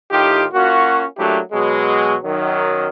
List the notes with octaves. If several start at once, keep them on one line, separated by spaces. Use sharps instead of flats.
A2 D#3 D#4 F4 G4
A#3 C#4 F4 F#4
F#3 A3 A#3 D4 E4 G4
B2 F#3 G#3
F#2 D#3 F#3